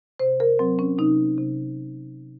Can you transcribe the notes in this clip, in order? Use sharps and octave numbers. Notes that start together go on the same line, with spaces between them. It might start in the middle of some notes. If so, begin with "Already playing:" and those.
C3 C5
A#4
F#3 C4
C#4
C3 D#4
C3